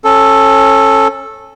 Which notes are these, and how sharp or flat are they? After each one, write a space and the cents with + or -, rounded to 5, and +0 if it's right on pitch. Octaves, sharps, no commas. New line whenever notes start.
C#4 -25 A4 +0